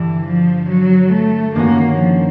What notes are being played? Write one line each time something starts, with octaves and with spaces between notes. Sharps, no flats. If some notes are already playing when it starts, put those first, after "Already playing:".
Already playing: G2 D3 E3 G3
F3
F#3
A3
G2 D#3 G#3 A#3 C#4 F#4
F3